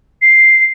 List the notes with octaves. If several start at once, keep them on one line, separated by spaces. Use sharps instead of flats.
C7